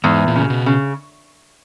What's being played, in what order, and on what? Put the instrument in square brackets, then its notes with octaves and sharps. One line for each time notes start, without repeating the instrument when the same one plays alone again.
[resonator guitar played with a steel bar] E2 [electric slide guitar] G#2
[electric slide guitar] A#2
[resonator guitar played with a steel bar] C#3
[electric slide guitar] B2
[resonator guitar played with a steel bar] C#3